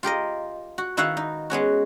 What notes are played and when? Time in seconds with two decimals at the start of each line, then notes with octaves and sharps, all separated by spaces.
0.03 F4 G4 A#4 D#5
0.78 F#4
0.97 D#3 E4 F#4 B4 F5 F#5
1.17 D#4
1.50 G#3 B3 C#4 F#4